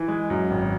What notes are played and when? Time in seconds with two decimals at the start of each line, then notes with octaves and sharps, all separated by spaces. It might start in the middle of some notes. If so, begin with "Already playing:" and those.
Already playing: E3
0.08 G#3
0.30 F#2
0.51 G#1